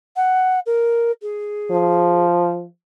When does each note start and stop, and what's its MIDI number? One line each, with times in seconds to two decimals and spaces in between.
0.16 0.60 78
0.66 1.11 70
1.22 2.27 68
1.71 2.66 53